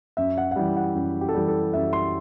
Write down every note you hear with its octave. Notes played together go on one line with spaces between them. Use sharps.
F#2 E5
F#5
F#5
E3 G3 G5
F#5
F#2 G4
G4
A4
E3 G3 G4
A4
F#2 E5
C6